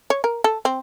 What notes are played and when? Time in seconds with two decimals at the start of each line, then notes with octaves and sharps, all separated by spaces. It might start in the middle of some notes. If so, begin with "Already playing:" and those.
0.10 C#5
0.24 A#4
0.44 A4
0.65 C4